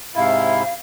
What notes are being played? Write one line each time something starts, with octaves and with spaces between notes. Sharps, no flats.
G#2 C3 E4 F5